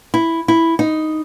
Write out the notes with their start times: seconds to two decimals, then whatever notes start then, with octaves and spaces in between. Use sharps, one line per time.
0.14 E4
0.48 E4
0.79 D#4